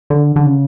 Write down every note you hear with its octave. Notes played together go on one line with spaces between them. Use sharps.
D3
D3
C#3